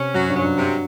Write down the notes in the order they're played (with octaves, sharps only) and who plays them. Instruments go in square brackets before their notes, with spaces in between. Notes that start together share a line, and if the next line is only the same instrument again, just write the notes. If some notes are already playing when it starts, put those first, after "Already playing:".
Already playing: [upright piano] C3 [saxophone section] C#4
[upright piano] F#2 [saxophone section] F#3
[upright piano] G2
[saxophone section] F#3
[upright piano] G2
[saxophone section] C3